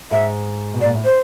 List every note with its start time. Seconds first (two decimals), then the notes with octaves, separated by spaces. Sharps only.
0.11 G#2 E5
0.74 B2
0.81 D5
0.84 A#2
0.94 A2
1.05 C5